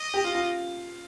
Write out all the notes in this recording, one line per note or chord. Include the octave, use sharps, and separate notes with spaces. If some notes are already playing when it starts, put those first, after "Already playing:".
Already playing: D#5
G4
F4
F4